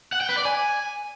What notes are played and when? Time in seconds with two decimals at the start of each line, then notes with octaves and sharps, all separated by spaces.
0.12 F#5
0.21 G5
0.29 B4
0.37 D5
0.45 G#5